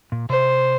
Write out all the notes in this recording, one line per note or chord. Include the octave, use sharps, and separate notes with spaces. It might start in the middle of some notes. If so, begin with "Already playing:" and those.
A#2
C3 C5